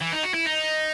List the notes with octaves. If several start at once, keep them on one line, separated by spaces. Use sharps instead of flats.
E3
D#4
F#4
E4
D#4